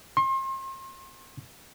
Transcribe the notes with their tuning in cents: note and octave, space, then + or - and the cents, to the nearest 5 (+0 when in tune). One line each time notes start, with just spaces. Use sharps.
C6 +35